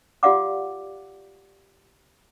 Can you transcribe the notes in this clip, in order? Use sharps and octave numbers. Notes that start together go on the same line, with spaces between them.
F4 G4 D5 F5 F#5 D6